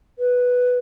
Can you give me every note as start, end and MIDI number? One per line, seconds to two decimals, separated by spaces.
0.19 0.78 71